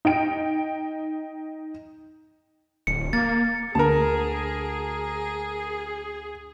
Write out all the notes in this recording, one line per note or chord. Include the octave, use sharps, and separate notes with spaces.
D#4 G5 D7
D1 C#7
A#3 A6
D2 G#4 A#4 A5